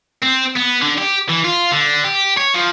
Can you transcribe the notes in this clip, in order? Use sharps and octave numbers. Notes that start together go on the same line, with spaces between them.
C4
B3
D3
G4
E3
F4
D3
G4
C#5
F3